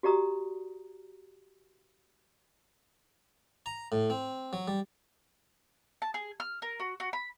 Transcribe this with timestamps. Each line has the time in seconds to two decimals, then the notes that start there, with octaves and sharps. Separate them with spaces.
0.03 F#4 G4 D5 A#5 D#6
3.66 A#5
3.92 A2
4.10 C4
4.53 F#3
4.68 G3
6.02 A5
6.14 G#4
6.40 F6
6.62 A#4
6.80 F#4
7.00 F#4
7.13 B5